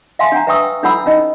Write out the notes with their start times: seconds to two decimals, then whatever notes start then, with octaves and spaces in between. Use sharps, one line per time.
0.19 E5 F5 G5 G#5 C6
0.32 D4 F#5 A#5
0.47 B4 E5 G5 C#6 D#6 E6
0.83 D4 E4 A4 F#5 B5 E6
1.06 C#4 D#4 D#5